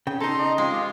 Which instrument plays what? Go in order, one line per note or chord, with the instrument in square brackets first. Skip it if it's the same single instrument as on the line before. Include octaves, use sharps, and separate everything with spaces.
[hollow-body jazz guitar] C#3 G5
[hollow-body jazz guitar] C#3 D#4 [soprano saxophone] A4 [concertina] A#5 C6
[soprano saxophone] D#5
[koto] G#3 [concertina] C4 F4
[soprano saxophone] F4 [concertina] G4